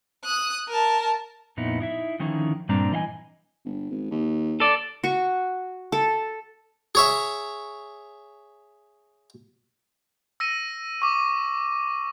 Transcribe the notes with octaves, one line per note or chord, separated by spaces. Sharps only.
D#6 F#6
A#4 A5
F2 A#2 B3 D#4 E4
D#4 E4 E5
D3 D#3 F3 C#4 D#4 E4
G2 A#2 G3 C4 D4 A#5
E3 E4 D#5 F5 G#5
G1
G#1
D#2
A4 D5
F#4 C#6
A4
G#4 C#5 E5
E6 A#6 D#7
C#6 D6